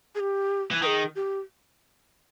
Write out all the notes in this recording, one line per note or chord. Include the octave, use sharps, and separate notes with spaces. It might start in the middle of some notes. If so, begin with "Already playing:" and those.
G#4
G4
E3
D#3 G#4 B4
G4